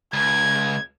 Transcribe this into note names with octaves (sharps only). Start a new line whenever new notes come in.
C#2 G#6